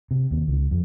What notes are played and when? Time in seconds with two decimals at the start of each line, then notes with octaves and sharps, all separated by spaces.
0.11 C3
0.31 D#2
0.48 C#2
0.71 F2